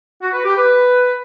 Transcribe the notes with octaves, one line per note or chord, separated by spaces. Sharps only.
F#4
B4
G4
B4